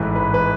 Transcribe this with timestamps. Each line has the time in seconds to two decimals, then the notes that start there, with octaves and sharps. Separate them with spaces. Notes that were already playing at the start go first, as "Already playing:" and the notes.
Already playing: A1 G#2 E3 B4
0.16 B4
0.34 B4